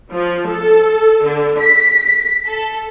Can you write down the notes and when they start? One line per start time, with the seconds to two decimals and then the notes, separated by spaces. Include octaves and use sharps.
0.12 F3
0.48 A4
1.25 D3
1.59 B6
2.47 A4